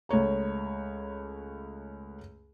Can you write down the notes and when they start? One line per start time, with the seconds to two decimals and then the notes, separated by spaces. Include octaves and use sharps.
0.09 C#2 A3 C#5 A#5